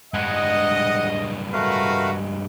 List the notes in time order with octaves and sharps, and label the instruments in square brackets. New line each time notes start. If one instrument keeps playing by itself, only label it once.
[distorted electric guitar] G2 G#3 [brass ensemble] D#5 [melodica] F#5
[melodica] A3 F5 [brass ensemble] F#4 A#4 B4